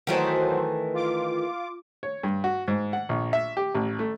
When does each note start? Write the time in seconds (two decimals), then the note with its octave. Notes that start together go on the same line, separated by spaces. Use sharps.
0.07 D#3 E3 F#3 A3 F#4 C5
0.93 F4 D6
2.03 C#5
2.23 G2
2.44 F#4
2.68 G#2
2.93 F#5
3.09 A#1
3.33 E5
3.57 G4
3.75 A1
3.99 A3